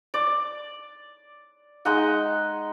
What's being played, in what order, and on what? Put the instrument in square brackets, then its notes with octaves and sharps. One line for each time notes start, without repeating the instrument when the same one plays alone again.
[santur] D5
G#3 D#4 D#5 F#5